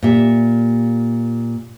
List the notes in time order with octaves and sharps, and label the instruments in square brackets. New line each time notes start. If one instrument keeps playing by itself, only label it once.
[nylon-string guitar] A#2 G4 E5